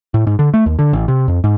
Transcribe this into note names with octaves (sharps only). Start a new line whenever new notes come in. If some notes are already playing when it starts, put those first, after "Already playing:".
A2
G#2
D3
A3
D#2
D3
A1
C3
F2
G#2